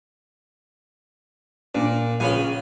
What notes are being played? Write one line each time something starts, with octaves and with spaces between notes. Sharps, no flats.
A#2 D4
A#1 C#3 C#5 F5 G#5